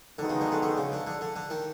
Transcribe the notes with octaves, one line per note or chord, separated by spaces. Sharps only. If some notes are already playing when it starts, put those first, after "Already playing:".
D3 D#3 G#3 B3 D#4 F#4
C#3
D3
D3
D3
C#3
D3
D3
D3
D3
D#3